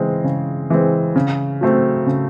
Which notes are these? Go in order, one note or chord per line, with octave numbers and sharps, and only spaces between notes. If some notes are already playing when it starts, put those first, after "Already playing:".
Already playing: C#3 E3 G#3 C4
C#3
E3 G#3 C4
C#3
F#3 A3 C4
C#3